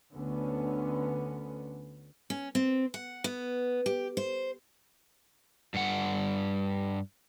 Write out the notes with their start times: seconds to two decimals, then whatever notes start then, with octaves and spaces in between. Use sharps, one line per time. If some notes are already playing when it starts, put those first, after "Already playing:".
0.13 D2 D3 B3 C#4
2.30 C#4
2.55 C4
2.94 F#5
3.24 B3
3.86 G4
4.17 C5
5.74 G2 F#5